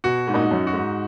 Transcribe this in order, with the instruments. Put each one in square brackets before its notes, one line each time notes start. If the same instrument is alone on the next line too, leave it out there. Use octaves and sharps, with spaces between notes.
[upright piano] B2 [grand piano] F#4
[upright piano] G#2
[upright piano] A#2 [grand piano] D#4
[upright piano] G#2
F#2
[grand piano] F#4
[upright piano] G#2